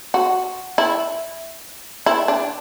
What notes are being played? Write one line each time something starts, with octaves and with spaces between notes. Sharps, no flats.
F#4
E4
E4
D4